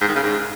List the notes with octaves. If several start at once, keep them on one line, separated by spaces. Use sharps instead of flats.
G#2
D#3
C#3
G#2